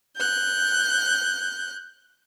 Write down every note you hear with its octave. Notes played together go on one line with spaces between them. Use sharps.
F#6 G6